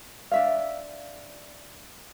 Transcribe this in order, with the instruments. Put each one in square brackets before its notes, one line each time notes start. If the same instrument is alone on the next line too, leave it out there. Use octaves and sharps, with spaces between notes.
[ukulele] D4 E5 F5